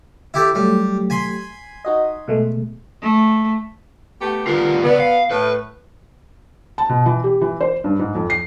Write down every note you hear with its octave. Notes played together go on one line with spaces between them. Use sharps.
E4 G4 A4
F#3 G3 A3 G4
G#5 B5 C6
D#4 F#4 D#5
B2 G#3 A3
A3
A3 B3 G4
D3 G3 B3 F4 A#4
C#2 B3 D5
F5
A2 B4
A5
B2
E3
G4
E3
C5
G2
G#2
F2
C7